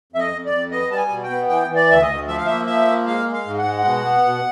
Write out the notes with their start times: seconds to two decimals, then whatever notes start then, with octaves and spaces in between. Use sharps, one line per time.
0.13 F2 E5
0.19 D#5
0.33 F2
0.45 D5
0.52 F2
0.71 B3 D#5
0.90 G3 A5
0.97 G#5
1.10 B2
1.23 G5
1.30 B3
1.49 E3 G5
1.69 E3
1.76 D5
1.90 D2 E5
2.02 D#5
2.08 D2
2.28 F3 E5
2.37 F5
2.46 A#3 E5
2.67 F3 E5
2.86 A#3
3.06 G#3 F5
3.26 G#3
3.33 F5
3.46 G#2
3.59 F#5
3.66 G#3
3.85 B2
4.05 B3
4.24 B2